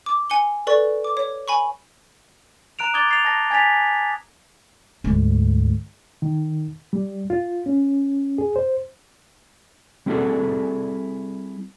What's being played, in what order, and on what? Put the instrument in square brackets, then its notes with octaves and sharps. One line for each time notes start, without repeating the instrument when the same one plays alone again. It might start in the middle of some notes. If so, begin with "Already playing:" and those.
[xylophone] D6
G#5 C#7 G7
A4 B4 D5 C#6
D6
C#5
G#5 B5 C#6
[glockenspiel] A#5 F#6 D7 F7
D6 D#6 G#6 A6 G7
A6 C7 F7
A5 A#6
G#5 G#6 A6 B6 F7
[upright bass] D2 G#2
[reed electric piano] D#3
G3
F4
C#4
G#4
C5
[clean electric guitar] G3 C4 E4 F#4 G#4 A4